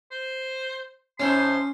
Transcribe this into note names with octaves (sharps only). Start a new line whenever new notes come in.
C5
A2 C#4 D#4 C5 C6